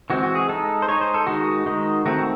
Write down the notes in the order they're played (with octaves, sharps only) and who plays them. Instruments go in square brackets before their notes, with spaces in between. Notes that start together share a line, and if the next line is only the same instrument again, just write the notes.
[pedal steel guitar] E3 G#3 C4 F#4
F#4
G#4
G#3 D#4 A4
C5
G#3 D#4 C#5
C5
A4
D#3 G#3 D#4 F#4
D#3 G#3 D#4
D#3 A3 C4 F#4